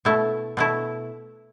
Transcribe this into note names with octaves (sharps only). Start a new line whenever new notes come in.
B2 A3 E4
B2 A3 E4